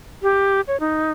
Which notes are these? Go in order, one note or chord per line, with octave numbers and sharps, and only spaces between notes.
G4
C#5
D#4